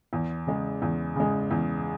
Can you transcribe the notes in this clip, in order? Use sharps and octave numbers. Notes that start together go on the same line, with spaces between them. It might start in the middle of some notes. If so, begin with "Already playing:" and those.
E2
C#3 G#3
E2
C#3 G#3
E2